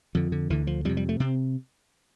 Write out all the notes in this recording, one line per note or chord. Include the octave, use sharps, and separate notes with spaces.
F2 D3 F3
D3
D2 D3 E3
F3
F2 C3 G3
G3
A3
C3 C4